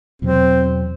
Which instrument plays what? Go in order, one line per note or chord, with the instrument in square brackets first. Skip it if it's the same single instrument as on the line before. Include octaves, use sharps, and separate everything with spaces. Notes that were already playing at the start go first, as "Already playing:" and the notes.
[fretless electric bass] E2 B2 F#3 [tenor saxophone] C4